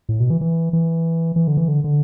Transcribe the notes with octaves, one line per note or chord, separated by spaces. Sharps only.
A2
B2
E3
E3
E3
E3
D3
E3
D3
D3